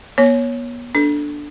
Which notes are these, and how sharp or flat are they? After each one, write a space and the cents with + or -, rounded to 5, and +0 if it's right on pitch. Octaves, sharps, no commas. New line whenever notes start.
B3 -35 C#5 +0
D4 +0 A4 +0